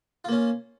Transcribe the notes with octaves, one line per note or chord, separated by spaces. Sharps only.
A#3 C#4 F4